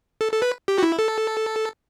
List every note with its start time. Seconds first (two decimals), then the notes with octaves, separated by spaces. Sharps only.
0.21 A4
0.32 A4
0.42 B4
0.68 G4
0.78 F#4
0.83 E4
0.99 A4